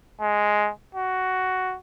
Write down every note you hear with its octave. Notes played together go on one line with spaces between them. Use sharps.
G#3
F#4